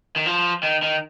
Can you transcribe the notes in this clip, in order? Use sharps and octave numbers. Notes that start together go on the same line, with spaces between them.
D#3
F3
D#3
D#3